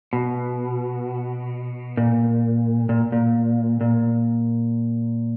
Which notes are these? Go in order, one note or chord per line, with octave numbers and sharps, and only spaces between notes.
B2
A#2
A#2
A#2
A#2